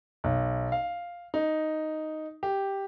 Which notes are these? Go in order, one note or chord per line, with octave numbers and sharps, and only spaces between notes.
B1
F5
D#4
G4